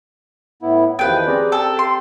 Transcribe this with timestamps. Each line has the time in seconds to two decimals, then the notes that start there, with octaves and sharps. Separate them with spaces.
0.63 A2 B3 E4
0.99 E2 D#3 F3 B3 G4 B4 G5
1.27 C4 G#4 D5 A#5
1.52 A4 G5
1.79 C6